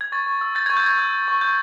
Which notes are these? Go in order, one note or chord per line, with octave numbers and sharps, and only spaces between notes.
G#6
C#6 A6
C#6
E6
G6 A6
C#6 G#6
G6
C#6 G#6
E6
G6
C#6
C#6 G6